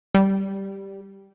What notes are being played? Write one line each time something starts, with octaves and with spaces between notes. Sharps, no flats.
G3